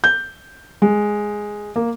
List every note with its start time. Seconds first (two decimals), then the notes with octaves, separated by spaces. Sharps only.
0.04 G6
0.82 G#3
1.76 A#3